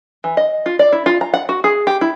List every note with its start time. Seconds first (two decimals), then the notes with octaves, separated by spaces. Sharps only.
0.24 E3
0.37 D#5
0.66 F4
0.79 D5
0.92 E4
1.06 F4
1.21 A#5
1.34 F#5
1.49 F#4
1.64 G#4
1.87 G4
2.01 E4